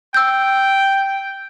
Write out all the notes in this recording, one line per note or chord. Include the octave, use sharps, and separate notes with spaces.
G5 E6 G6